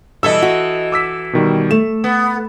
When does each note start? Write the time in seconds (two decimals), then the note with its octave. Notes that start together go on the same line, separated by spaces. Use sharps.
0.23 B2 E3 G3 A4 D#5 E5 E6
0.42 F#4
0.92 D6 E6 B6
1.33 B2 D#3 G3
1.71 A3 E7
2.04 B3